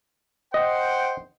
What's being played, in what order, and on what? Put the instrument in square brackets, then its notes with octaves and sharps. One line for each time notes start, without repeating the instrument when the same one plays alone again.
[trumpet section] C5 F#5 G5 [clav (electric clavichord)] D#5